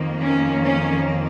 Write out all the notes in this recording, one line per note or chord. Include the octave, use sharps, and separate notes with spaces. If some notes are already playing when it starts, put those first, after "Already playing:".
Already playing: F2 D#3 A#3
C#4
C#4